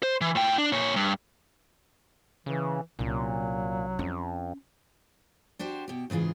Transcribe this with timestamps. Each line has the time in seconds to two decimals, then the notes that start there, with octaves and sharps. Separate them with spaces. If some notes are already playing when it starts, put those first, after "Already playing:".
0.03 C5
0.21 E3
0.35 A2 G5
0.58 D4
0.72 A#2 C#5
0.96 G2
2.46 C#3 E3
2.99 C2 A#2 F#3 C#4
3.99 F2 C#4
5.59 D4 F#4 G4 C5
5.88 B2 G4
6.10 G#2 C#3 E3 F4 G#4